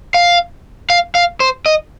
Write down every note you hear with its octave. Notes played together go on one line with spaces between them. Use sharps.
F5
F5
F5
C5
D#5